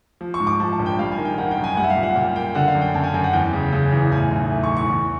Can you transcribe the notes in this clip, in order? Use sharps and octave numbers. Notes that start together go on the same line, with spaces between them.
F3
C#6
G#2
D6
F3 A5
A5
A#1
G5
G3 F5
G#5
D#3
G5
D#3 F#5
G5
F#2
G#5
G3 F#5
E5
F5
A#2
F#5
A#2 G5
A#3 G5
D3 F#5
F5
F#2
G5
F#2 A5
G#5
F#2 G5
F#5
E2 G5
C#3
C#3
E2
A2 G#5
B1
A3
C#6
E3
C#6
E2